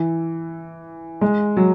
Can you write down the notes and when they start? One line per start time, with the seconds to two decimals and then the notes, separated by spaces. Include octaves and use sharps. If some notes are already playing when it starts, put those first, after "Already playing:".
Already playing: E3
1.21 G#3
1.57 F#3